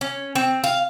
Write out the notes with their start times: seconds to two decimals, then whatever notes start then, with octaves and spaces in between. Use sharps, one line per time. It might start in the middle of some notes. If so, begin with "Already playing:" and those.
0.01 C#4
0.35 C4
0.64 F5